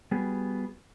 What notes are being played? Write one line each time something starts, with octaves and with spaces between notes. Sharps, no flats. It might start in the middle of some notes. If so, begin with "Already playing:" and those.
G3 B3 F#4 G#4